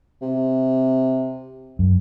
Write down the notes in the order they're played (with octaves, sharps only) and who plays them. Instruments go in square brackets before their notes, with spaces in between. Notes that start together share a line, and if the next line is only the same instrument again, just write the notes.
[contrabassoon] C3
[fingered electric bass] F#2